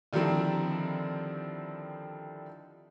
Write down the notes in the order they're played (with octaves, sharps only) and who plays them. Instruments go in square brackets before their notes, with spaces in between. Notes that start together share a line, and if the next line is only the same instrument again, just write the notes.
[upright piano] D3 D#3 F3 G3 C4 E4